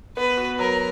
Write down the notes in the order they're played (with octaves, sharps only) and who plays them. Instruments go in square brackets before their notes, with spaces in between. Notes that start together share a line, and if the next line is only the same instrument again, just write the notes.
[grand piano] B3 [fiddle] B4
[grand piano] F#4
[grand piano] F#3 [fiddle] A#4